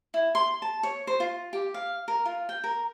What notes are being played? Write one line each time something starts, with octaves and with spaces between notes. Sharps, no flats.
E4
C6
A5
C#5
C5
F4
G4
F5
A#4
F4
G5
A#4